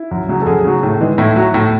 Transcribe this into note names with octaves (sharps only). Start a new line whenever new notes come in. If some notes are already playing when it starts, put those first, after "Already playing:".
Already playing: E4
F#2
C#3 F#3
A4
F#2 G#4
C#3 F#3
A2
E3 G#3
A2 E4
F#3
A2